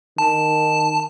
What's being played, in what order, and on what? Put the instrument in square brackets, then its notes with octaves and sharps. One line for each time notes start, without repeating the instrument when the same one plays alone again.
[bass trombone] D#3 [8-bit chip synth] A5